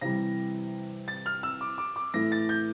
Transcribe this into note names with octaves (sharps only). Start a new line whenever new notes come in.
C3 E3 G3 A#6
A6
F6
E6
D6
D6
D6
A2 E3 A3 A#6
A6
G6